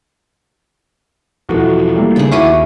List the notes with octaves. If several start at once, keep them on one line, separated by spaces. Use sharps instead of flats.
E2 B2 F3 E4 F#4 A4
G3 A3 A#3
C#3 D4 G#4 G5
D#2 C#4 E4 F#4 E5 C#6 D6 D#7